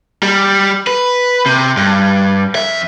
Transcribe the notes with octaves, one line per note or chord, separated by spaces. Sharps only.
G3
B4
C3
G2
F2 E5